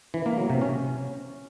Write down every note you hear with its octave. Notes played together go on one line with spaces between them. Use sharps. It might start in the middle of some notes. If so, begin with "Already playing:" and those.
E3
A#3
F#3
C3
C#4